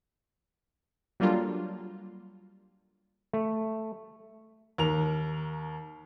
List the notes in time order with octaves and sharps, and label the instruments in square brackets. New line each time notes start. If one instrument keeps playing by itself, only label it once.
[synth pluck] F#3 G3 A#3 D4 F4 A4
[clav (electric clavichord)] A3
[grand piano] D#2 A#4 F7